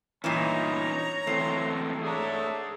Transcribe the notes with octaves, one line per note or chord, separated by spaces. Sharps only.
G2 A#2 E3 C#4 D#4 C#5 A#5
E3 F#3 A3 C4 C5
D4 G#4 C#5 E5 A#5